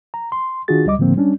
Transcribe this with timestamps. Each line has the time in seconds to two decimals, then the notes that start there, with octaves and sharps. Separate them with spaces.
0.14 A#5
0.32 C6
0.68 D#3 D4 F4 F#4 G#4 A6
0.86 C#2 G3 D#5 D6
0.99 A2 D3 F3 A#3 C4
1.16 G3 C#4 D4